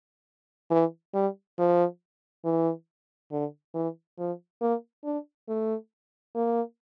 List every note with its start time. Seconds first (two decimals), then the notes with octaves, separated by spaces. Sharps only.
0.71 E3
1.14 G3
1.58 F3
2.45 E3
3.32 D3
3.74 E3
4.18 F3
4.61 A#3
5.04 D4
5.49 A3
6.35 A#3